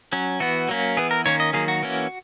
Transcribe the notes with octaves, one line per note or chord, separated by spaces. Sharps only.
F#3 C#4
E3 B3 F#4
F#3 A#3 C#4
E3 B3 G#4
A#4
D#3 A#3 C#4 C#5
D#5
D#3 F#3 A#3 G#4
F#4
E3 A#3 C#4